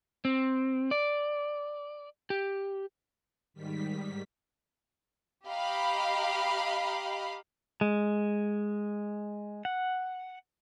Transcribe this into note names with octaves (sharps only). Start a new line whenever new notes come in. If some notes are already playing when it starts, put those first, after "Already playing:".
C4
D5
G4
G#2 D#3 G3 B6
G4 D#5 F5 A#5 B5
G#3
F#5